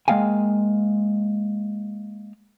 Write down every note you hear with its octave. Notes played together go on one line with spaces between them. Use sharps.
G#3 A#3 F5 G5 G#5